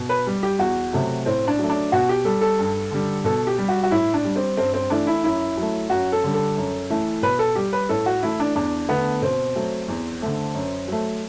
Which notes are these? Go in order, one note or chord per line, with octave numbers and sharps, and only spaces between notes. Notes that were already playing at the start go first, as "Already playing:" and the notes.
Already playing: B2
B4
G3
G4
E2 F#4
C3 F#3 A3
A2 C4
D4
F#3 A3
D4
B2 F#4
G4
G3 A4
A4
G2
D3 G3
B2 A4
G4
G3
F#4
F#4
A2 E4
D4
G3
C4
G2 C4
C4
E3 A3 D4
E4
F#2 E4
F#3 A3
F#2 F#4
A4
D3 G3
A4
F#2
E3 A3
B2 B4
A4
G3 G4
B4
A2 A4
F#4
E3 A3 E4
D4
E2 D4
D3 A3 B3
B2 C4
F#3 A3
E2
D3 A3
F#2
F#3 A3